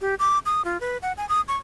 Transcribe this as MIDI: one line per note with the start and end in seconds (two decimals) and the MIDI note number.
0.01 0.15 67
0.19 0.39 86
0.46 0.65 87
0.65 0.80 65
0.81 0.98 71
1.02 1.13 78
1.17 1.27 80
1.29 1.41 87
1.48 1.57 85